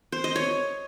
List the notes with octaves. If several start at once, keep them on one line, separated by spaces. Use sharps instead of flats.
C5
D#5
C#5